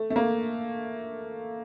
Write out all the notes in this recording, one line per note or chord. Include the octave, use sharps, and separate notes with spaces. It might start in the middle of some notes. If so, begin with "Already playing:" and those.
Already playing: A3
A3
A#3